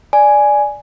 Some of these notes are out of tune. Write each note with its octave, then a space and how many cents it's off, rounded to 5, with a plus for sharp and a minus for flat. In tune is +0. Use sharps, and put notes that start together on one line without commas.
D5 +0 G#5 +5